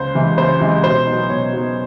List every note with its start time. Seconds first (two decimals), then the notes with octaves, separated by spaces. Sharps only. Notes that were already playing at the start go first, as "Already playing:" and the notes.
Already playing: C#2 C5
0.15 C3 E3 G#3
0.38 C#2 C5
0.61 C3 E3 G#3
0.84 B2 C5
1.06 F#3 B3 D#4
1.29 B2 C#5
1.53 F#3 B3 D#4